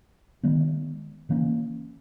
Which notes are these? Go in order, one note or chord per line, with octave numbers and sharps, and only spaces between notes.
D#3 G#3 B3
C#3 E3 A#3 C#4